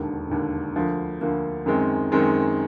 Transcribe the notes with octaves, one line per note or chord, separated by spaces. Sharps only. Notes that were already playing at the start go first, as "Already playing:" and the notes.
Already playing: E1 D#2 D3
E1 D#2 D3
D2 D3 F3 A#3
D2 D3 F3 A#3
F#2 D#3 G#3 C4
F#2 D#3 G#3 C4